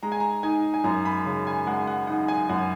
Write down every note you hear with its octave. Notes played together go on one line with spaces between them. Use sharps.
G#3 A#5
G#5
A#5
D#4 G#5
G#5
F#2 A#5
B5
C#3
G#5
G#3 F#5
F#5
D#4 F#5
G#5
F#2 F#5